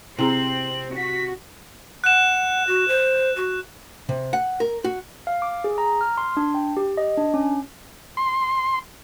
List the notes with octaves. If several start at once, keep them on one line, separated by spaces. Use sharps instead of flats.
C3 C4 E4 G#4 A#5 F#7
F#4 B6
F#5 F#6 E7
F#4
C5
F#4
C3
F#5
A#4
F#4
F5
D6
G#4
A#5
F6
C6
D4
G5
G4
D#5
D4
C#4
C6